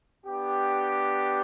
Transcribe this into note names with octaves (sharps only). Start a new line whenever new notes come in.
B3 D4 G4